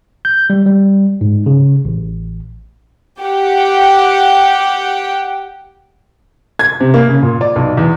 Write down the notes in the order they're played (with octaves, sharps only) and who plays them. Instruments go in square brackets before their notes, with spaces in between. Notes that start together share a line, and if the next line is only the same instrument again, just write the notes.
[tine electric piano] G6
G3
G3
G#2
C#3
A1
[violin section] G4 F#5 G5
[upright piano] G#6
C3
A#3
C#3
A#2
D5
B1
E2